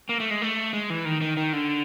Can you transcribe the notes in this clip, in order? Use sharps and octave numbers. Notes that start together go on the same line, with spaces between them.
A#3
A3
G#3
A3
G#3
E3
D#3
D#3
D#3
D3